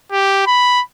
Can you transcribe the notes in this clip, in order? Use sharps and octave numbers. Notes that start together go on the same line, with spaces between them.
G4
B5